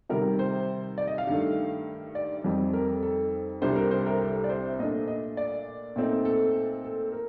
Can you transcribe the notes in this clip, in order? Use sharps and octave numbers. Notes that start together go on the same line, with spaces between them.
C3 D#3 G3 A#4
C5
D5
D#5
F5
G2 D#3 A3
D5
F2 D#3 G3 C4 D#4
A#4
A4
A4
C2 C3 G3 D4 C5
A#4
C5
A#4
A4
D5
C5
A#2 A3 D4 D#5
D#5
D5
A#2 A3 C4 D#4
A4
A4
A#4